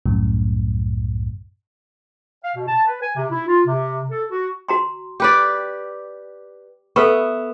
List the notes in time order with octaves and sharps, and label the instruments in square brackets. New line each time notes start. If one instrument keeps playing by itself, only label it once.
[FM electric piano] C2 F#2 A2
[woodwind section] F5
B2
A5
B4
G#5
C3
E4
F4
C3
A4
F#4
[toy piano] F#4 A#5 C6
[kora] G4 B4 D5
[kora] B3 E5 [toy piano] A4 B4 C#6